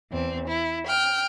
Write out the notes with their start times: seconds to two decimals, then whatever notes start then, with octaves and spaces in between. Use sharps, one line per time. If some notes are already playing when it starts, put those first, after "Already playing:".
0.10 E2 C4
0.48 E4
0.86 G5 F6